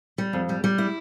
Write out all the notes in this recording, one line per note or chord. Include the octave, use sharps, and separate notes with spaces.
G3
F2
G3
G3
E4